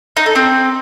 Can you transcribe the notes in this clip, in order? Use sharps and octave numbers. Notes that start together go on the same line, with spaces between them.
D#4
A4
C4